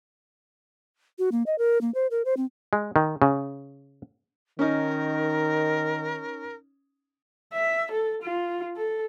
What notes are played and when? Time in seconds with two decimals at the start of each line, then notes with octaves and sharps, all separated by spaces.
1.19 F#4
1.32 A#3
1.46 D#5
1.58 A#4
1.81 A#3
1.94 C5
2.11 A#4
2.25 C5
2.37 C4
2.73 G#3
2.96 D#3
3.22 C#3
4.59 D#3 C#4 D#4 A#4
7.54 E5
7.91 A4
8.22 F4
8.77 A4